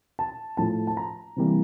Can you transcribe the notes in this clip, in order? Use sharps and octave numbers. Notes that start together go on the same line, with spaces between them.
A5
A2 F3 A3 A5
A5
A#5
C3 E3 G3 A#3